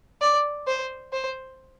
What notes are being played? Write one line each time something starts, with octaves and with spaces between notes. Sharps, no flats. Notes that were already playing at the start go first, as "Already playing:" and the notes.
D5
C5
C5